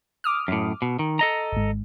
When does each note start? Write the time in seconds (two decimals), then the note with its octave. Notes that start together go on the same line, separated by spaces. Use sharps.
0.24 D6 D#6 F6
0.48 F#2 A2
0.82 B2
0.99 D#3
1.19 A4 D#5 A#5
1.52 G#1 G#2